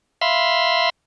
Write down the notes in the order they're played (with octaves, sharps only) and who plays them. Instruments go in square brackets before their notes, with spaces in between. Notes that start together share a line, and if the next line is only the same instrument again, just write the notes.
[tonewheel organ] E5 F5 B5 C6